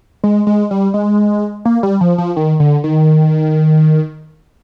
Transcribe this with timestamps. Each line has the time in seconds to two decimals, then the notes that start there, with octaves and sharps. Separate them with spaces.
0.24 G#3
0.47 G#3
0.71 G3
0.94 G#3
1.65 A#3
1.83 G3
2.01 F3
2.18 F3
2.36 D#3
2.60 D3
2.84 D#3